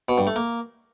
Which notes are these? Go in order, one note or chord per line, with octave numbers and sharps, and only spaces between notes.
B2
G2
A3
A#3